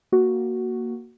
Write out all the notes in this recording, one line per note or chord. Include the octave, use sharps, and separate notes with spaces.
A#3 F#4